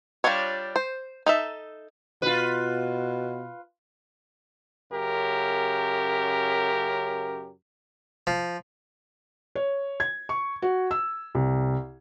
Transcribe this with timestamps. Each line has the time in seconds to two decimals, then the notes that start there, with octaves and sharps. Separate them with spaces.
0.24 G3 D4 F4 A4 C#5
0.76 C5
1.26 D#4 A4 E5
2.22 B2 F4 B4
4.91 F#2 C#3 G4 A#4
8.27 F3
9.55 C#5
10.00 G#6
10.29 C#6
10.62 F#4
10.91 E6
11.35 C2